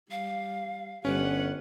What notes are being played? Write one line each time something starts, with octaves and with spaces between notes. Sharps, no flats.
G3 F5
G1 G3 C#4 B4 F#5